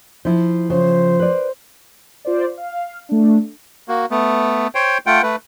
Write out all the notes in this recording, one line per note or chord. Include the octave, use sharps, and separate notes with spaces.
F3 E4
C#3 F3 C5
B4 D5
F4 C5 D5
F5
A3 D4
A#3 F#4
A3 B3
C5 C#5 G5
A3 F4 F#5 G5
A3 B4